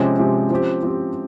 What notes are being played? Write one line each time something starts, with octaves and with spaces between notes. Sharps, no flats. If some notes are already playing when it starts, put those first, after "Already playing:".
Already playing: C3 F3 G#3 C4 C#4 G4
C3 F3 G#3 C4 G4
F3 C4 G4
F3 C4 G4